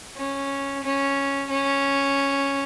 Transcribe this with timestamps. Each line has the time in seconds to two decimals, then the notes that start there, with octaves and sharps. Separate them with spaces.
0.16 C#4
0.84 C#4
1.50 C#4